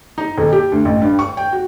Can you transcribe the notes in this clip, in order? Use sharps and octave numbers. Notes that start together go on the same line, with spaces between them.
D#4
D#1
G4
D2
A1
G2
C#6
G5
F#4